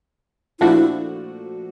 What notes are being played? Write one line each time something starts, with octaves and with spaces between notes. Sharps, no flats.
A#2 F3 A3 D4 E4 F#4